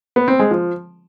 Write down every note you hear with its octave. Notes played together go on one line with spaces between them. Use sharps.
B3
C4
G#3
F3